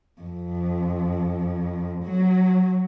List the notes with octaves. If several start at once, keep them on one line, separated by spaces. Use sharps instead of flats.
F2
F#3